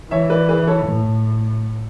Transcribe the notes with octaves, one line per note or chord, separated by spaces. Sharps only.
E3 C#5 E5
B4 D5
G#4 B4
A4 C#5
A2